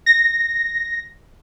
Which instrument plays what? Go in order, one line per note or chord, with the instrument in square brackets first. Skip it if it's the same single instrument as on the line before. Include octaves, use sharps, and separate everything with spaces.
[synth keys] A#6